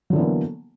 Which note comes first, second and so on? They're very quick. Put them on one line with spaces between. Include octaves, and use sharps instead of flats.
F#3 D3 E3 B3 A#3